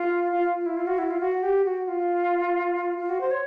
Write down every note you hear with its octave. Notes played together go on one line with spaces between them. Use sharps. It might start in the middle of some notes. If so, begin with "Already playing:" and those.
Already playing: F4
F4
F4
E4
F4
F#4
E4
F4
F#4
G4
F#4
F4
F4
F#4
C5
C#5